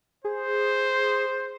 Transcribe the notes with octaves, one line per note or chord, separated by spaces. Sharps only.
G#4 C5